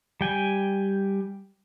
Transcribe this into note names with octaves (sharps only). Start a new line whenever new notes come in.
G3 G5 G#5